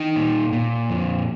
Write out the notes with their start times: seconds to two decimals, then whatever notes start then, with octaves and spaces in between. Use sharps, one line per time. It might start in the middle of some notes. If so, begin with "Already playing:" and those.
Already playing: D#4 G5
0.16 A#2
0.53 A#2
0.89 F2